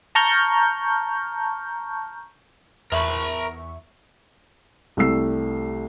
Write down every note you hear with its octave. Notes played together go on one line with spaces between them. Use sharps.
A5 A#5 C#6 F6 G6
E2 A#4 E5 B5 C#6
C2 G3 A3 E6 C7